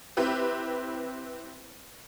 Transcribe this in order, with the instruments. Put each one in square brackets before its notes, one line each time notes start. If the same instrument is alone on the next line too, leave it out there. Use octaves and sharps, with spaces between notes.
[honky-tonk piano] C4 E4 G4 B4